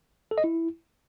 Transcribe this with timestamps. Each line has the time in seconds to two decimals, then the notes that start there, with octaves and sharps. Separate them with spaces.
0.31 A4
0.38 D#5
0.44 E4